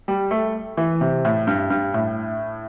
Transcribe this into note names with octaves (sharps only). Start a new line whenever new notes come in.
G3
A3
E3
C3
A2
G2
G2
A2